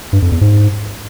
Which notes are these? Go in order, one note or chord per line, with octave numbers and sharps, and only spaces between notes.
G2
F2
E2
G#2